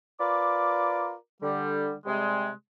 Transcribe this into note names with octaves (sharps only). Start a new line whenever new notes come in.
F4 A#4 B4 D5 D6
D3 G3
C3 G3 G#3